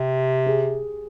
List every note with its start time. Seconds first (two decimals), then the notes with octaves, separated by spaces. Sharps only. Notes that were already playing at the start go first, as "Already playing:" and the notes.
Already playing: C3 G4
0.46 G#4